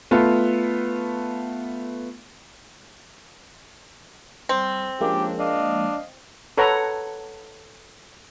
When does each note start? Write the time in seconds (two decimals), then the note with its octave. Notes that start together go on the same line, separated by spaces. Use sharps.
0.11 A3 B3 F4
4.49 F2 G3 C4
5.01 F3 G#3 A#3 C#4 D4 G4
5.39 D4 D#5 F5
6.58 A4 B4 C#5 F#5 A#5